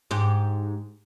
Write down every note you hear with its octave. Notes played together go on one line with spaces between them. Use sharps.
G#2 G4